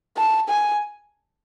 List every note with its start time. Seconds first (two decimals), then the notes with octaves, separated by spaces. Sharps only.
0.18 A5
0.50 G#5